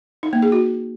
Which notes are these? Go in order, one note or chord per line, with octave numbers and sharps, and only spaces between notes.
D#4
A#3
G#4
F#4